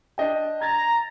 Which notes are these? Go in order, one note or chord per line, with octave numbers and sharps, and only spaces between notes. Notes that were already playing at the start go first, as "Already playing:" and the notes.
D4 D#5 G5
A#5 G#6 A6